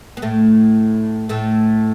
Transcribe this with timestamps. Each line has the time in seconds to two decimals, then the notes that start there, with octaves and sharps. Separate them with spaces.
0.17 B3
0.22 A2 A3
1.29 A2 A3